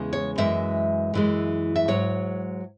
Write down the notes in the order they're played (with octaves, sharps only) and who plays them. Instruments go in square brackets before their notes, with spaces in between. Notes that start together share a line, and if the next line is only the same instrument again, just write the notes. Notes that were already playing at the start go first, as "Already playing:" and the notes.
Already playing: [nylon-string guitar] E2 C#3 G#3
C#5
F#2 E3 G#3 E5
F#2 E3 G#3
E5
G#2 F#3 C#5